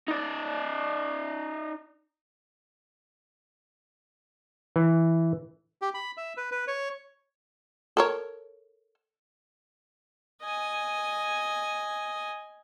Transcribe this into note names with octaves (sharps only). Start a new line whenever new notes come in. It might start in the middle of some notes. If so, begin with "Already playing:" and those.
D#4 D5
E3
G4
B5
E5
B4
B4
C#5
A4 A#4 C#5
D#5 G#5